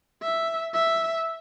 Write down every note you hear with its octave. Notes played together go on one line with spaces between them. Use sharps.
E5
E5